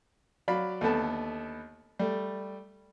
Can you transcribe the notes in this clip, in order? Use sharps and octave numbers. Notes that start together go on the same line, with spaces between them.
F#3 D5 F5 B5
D#2 D3 A3 B3 A5
G3 A3